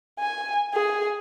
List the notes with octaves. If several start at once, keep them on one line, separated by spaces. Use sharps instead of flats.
G#5
G#4